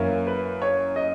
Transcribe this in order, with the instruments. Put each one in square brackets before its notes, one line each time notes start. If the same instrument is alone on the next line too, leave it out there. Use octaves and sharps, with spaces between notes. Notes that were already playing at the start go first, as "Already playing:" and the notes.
Already playing: [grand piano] F#2 E3 A#3 E4 A#4 [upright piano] C#5
[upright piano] B4
C#5
D#5